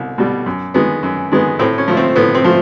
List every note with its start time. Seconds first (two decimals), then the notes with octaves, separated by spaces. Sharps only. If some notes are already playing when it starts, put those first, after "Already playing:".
Already playing: C2 B2
0.18 B2 G3
0.46 F#2
0.74 D#3 G#3 B3
1.03 F#2
1.32 D#3 G#3 B3
1.59 A2 C4
1.78 C#4
1.88 F3 A3
1.97 C4
2.16 A2 B3
2.35 C4
2.44 F3 A3